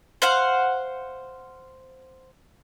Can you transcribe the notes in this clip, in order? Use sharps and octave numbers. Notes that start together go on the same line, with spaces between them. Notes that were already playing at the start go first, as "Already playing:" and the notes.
C5 F5 F#5